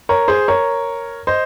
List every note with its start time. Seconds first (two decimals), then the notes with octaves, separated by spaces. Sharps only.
0.09 A#4 C#5
0.28 G#4 C5
0.48 A#4 C#5
1.27 C5 D#5